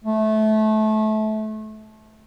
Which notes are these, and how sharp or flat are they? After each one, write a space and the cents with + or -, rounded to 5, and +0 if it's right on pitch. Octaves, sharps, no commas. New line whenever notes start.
A3 -25